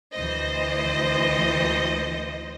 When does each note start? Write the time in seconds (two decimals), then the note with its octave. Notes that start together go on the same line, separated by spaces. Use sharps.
0.14 D2 E3 C5 D#5